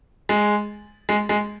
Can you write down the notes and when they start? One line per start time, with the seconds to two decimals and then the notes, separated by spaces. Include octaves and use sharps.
0.29 G#3
1.09 G#3
1.29 G#3